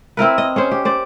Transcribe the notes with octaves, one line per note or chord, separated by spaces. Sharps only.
C4 E4 A#4 B4
D#5
C#4 G#4 C5
G4
C5 D5